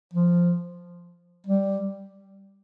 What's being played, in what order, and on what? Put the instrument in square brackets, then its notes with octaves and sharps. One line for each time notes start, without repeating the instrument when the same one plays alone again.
[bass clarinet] F3
G3